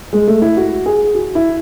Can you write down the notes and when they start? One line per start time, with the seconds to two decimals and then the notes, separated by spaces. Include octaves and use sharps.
0.13 G#3
0.27 A3
0.42 E4
0.57 F#4
0.86 G#4
1.15 F#4
1.35 E4